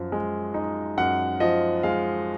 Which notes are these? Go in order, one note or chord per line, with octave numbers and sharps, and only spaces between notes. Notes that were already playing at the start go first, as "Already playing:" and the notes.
Already playing: F#2 F3
G#3
D#4
F#2 F#5
F3 D#5
G#3 F5